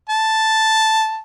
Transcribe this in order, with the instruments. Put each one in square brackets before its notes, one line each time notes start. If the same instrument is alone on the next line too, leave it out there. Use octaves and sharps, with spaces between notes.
[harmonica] A5